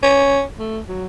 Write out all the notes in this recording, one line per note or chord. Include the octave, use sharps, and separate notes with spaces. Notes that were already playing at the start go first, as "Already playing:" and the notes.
C#4
A3
F#3